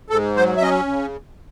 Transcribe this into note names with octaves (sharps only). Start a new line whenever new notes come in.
G#2 A4
F#3 C5
E5
C#4 D#5
C#3